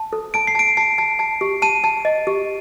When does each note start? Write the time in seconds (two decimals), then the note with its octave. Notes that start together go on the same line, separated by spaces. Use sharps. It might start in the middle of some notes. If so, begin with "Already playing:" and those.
Already playing: A5
0.13 A4
0.34 A5 D7
0.47 C7
0.55 A5 D7
0.77 A5 C7
0.98 A5
1.19 A5
1.41 G4
1.62 A5 D#7
1.84 A5
2.05 D#5
2.27 G4